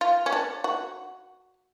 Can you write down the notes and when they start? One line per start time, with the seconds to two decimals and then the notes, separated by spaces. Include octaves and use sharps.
0.01 F4
0.26 C#4
0.32 D4
0.64 F#4